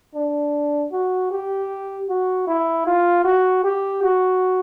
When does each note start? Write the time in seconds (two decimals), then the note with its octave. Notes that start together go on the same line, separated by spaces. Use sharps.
0.15 D4
0.92 F#4
1.31 G4
2.09 F#4
2.47 E4
2.87 F4
3.25 F#4
3.64 G4
4.03 F#4